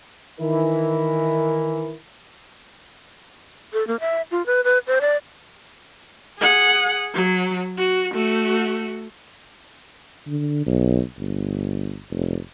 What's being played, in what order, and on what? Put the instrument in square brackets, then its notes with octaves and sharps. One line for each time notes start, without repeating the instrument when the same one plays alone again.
[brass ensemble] D#3 E3 E4 A#4
[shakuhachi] A4
A#3
E5
F4
B4
B4
C5
D5
[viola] G#4 F#5
F#3
F#4
A3 F#4
[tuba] D3
B1
G1
F1